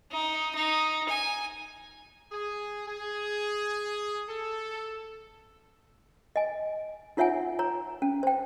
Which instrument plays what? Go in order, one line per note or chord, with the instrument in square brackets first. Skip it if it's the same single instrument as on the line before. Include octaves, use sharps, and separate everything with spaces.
[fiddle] D#4
D#4
G#5
[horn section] G#4
G#4
A4
[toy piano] D#5 G#5
D#4 F4 C#5 E5 F#5 G#5
C#5 A#5
C#4
C5 G5